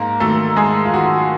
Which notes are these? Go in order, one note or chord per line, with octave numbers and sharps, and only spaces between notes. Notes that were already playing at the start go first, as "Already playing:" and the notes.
Already playing: G#2 A#3 A#4
D#3 F#3 A3 A4
G#2 G#3 G#4
F4
D#3 F#3 F#4